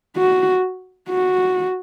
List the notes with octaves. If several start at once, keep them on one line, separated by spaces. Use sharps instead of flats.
F#4
F#4